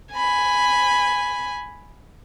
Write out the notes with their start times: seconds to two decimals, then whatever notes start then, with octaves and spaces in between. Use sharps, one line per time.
0.14 G#5 B5